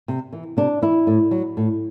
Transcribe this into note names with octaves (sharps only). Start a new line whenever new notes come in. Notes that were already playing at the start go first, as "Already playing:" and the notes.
C3
E3
C3 D4
E3 E4
A2
F#3
A2